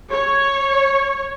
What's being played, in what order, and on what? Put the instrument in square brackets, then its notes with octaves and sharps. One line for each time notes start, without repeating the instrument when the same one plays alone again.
[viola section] C#5